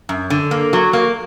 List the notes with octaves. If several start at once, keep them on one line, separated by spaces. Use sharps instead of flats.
F#2
D3
A#3
F#3
A#3